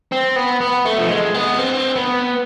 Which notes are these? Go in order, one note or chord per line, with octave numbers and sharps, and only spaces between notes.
C4
B3
B3
A3
F3
G#3
B3
C4
B3